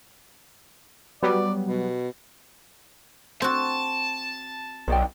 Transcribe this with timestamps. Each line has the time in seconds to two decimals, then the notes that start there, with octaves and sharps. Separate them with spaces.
1.22 F#3 G3 B3 D5
1.67 B2
3.42 C4 F#4 A5
4.88 B1 D#4 D5 G5